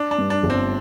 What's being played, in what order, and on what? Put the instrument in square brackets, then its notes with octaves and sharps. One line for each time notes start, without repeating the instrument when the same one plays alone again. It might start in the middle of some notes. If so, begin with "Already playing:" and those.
Already playing: [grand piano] D4
D4
[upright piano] G2
[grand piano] D4
[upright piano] G1
[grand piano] C4